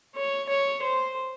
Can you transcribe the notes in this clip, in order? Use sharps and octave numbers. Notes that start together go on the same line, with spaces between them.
C#5
C#5
C5